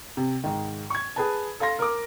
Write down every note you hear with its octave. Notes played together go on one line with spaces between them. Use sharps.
C3
G#2 D#3
C#6 G#6
G#4 B4 A5
A4 F5 C6 A#6
A#4 D6